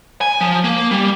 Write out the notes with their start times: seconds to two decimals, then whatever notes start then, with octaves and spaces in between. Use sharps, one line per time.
0.21 G#5
0.41 F3
0.64 A#3
0.91 G3